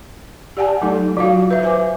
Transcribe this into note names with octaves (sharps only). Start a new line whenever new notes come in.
G4 D5 F#5 G#5 A5
F#3 A3 D#4 A4
F#3 F4 F#4 F5
B4 E5
C5 G#5 D6